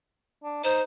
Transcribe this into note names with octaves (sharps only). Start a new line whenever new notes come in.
D4
D#4 C5